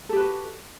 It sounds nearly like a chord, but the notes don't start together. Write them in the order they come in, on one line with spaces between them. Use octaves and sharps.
A4 G4 B4 F#4